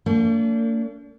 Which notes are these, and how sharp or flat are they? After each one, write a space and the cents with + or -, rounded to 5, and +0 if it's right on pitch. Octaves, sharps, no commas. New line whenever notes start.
A#3 -45 D4 -35